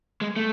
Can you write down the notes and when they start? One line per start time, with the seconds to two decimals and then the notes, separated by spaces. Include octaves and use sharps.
0.21 G#3
0.36 A3